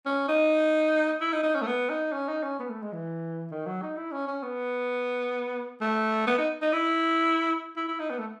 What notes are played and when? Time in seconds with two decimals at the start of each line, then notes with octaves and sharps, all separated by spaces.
0.06 C#4
0.28 D#4
1.21 E4
1.33 D#4
1.43 D#4
1.55 C#4
1.62 A3
1.67 B3
1.90 D#4
2.13 C#4
2.29 D#4
2.43 C#4
2.59 B3
2.70 A3
2.82 G#3
2.93 E3
3.51 D#3
3.66 F#3
3.82 D#4
3.97 E4
4.12 C#4
4.27 C#4
4.43 B3
5.81 A3
6.27 B3
6.38 D#4
6.62 D#4
6.73 E4
7.76 E4
7.88 E4
8.00 D#4
8.10 B3
8.19 A3